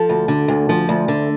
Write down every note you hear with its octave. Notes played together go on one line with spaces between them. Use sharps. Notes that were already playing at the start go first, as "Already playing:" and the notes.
Already playing: F3 A4
D2
D3
D2
F3
D2
D3